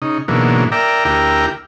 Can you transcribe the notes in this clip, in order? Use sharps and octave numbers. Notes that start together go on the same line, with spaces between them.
C#3 D#4
G#2 B2 D3 E3 F#3 A#3
A#4 D5 E5 G5 A#5
D2 E4 G4 A#4 G5 A#5